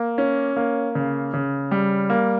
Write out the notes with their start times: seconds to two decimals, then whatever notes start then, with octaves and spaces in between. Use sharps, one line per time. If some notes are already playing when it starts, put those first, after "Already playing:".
Already playing: A#3
0.18 C#4
0.56 A#3
0.95 C#3
1.34 C#3
1.71 G3
2.10 A#3